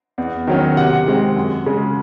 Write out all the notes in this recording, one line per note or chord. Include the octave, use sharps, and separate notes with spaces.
E2
D#3 F#3 C#4
C3 F#5
D#3 G#3 C4
F#2
C#3 G#3